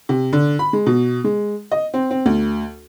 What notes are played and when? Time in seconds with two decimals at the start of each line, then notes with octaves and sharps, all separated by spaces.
0.09 C3
0.33 D3
0.59 B5
0.73 G#3
0.86 B2
1.24 G#3
1.72 D#5
1.94 C4
2.11 C4
2.26 D2